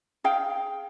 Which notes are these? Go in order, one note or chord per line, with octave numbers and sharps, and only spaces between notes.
G#4 F5 G5